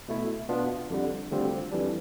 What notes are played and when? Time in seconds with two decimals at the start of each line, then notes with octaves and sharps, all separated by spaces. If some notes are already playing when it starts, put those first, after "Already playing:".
0.08 B2 A3 E4
0.49 B2 B3 D4 F4
0.90 F2 D3 G3
1.31 D2 D3 G3 C4 F4
1.72 F2 E3 G3 D4